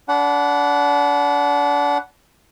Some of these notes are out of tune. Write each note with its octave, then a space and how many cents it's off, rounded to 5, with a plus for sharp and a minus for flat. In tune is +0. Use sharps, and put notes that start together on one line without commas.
D4 -30 F#5 +0 B5 -15